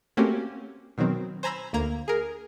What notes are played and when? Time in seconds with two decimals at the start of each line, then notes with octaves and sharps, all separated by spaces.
0.17 A3 A#3 C4 C#4 F#4 G4
0.98 B2 D#3 F#3 C4
1.43 C5 G#5 A#5 B5 E6
1.73 D2 A#3 A#5 G#6
2.08 G#4 A#4